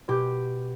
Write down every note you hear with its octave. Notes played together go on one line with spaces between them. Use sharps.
B2 G4